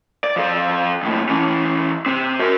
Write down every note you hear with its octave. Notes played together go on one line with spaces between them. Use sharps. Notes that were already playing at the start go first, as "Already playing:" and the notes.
D5
F3 A4
D#2 A2
E3 C#4
C3 C4
F#4 A#4